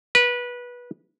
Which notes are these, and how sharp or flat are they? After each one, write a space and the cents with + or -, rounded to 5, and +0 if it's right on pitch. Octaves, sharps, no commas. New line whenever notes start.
B4 -20